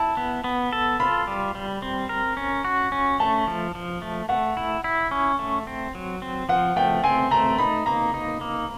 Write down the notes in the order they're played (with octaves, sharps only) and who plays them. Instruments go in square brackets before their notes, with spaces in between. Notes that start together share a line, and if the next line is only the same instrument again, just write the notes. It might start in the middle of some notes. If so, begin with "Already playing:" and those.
Already playing: [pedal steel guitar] E4 [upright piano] A5
[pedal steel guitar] B3
B3
A4
[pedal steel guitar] F4 [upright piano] B5
[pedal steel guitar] G3
G3
C4
A#4
C#4
F#4
C#4
[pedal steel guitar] A3 [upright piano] A5
[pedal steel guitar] F3
F3
A3
[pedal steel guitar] A3 [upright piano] F#5
[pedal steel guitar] E4
E4
C#4
A3
C4
F#3
C4
[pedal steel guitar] F3 [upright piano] F#5
[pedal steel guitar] A3 [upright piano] G5
[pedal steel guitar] C4 [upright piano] G#5
[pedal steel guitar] A3 [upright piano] A#5
[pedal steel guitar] D#4 [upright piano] B5
[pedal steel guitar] A#3 [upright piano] A#5
[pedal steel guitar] D#4
A#3